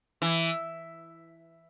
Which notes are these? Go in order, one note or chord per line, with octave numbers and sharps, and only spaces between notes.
E3